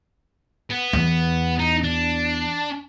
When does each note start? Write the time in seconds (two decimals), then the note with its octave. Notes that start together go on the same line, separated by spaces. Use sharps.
0.70 B3
0.93 E2
1.59 D#4
1.84 D4